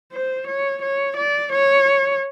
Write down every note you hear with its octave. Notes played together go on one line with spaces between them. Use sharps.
C5
C#5
C#5
D5
C#5